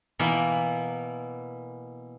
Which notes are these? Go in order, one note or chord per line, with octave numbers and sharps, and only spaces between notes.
B2 E3 A#3 B3